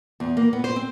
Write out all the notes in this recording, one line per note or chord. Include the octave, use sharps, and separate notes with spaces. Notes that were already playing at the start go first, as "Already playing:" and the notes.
E2
A#3
B3
C5
C4